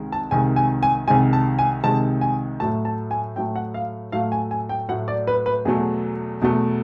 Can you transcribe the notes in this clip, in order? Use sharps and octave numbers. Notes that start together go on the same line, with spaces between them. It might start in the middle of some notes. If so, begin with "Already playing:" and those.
Already playing: C2 C3 D#3 G#3
A5
C2 C3 D#3 G#3 G#5
G#5
G#5
C2 C3 D#3 G#3 G#5
A5
G#5
C2 C3 D#3 G#3 A5
G#5
A2 F#3 A3 A5
A5
G#5
A2 F#3 A3 G5
F#5
F5
A2 F#3 A3 F5
G#5
G#5
G5
A2 F#3 A3 F#5
D5
B4
B4
E2 B2 F#3 A3 G#4
E2 B2 F#3 A3